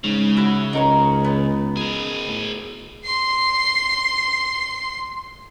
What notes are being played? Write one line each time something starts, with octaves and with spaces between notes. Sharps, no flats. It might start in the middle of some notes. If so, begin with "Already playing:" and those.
G#2 C#3
E4 F#4
C#2 D#4 A#4 C#5
B3 D#4
G#4 A#4
A2
C6 C7